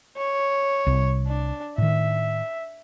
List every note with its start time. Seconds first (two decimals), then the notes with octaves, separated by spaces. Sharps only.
0.17 C#5
0.87 C2 C3
1.26 D4
1.78 A2 D#3 E5